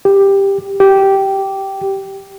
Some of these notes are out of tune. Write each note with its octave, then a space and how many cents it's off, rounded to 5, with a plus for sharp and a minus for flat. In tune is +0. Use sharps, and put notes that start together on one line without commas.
G4 +10
G4 -10